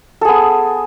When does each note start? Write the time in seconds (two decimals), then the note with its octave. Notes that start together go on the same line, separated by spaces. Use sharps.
0.21 A4
0.25 G#4
0.28 B3